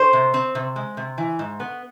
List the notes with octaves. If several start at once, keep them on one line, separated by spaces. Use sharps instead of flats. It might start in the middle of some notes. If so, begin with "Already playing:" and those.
Already playing: C5
C3
C4
C3
G#3
C3
E3
G#2
B3